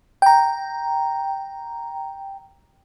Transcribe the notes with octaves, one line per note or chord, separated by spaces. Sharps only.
G5 A#5